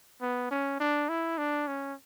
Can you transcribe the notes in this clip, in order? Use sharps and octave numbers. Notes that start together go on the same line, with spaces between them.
B3
C#4
D4
E4
D4
C#4